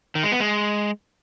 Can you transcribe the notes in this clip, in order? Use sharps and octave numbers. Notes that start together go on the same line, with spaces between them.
D#3
G#3
B3
G#3